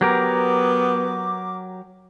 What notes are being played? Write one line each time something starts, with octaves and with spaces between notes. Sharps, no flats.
F#3 B3 G4 A#4 D6